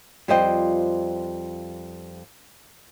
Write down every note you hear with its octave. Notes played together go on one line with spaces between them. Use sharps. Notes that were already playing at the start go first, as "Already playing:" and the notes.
F2 G3 F4 C5 D#5 G5